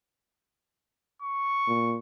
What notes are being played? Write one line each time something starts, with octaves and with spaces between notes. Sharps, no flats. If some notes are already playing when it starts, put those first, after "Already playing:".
C#6
A#2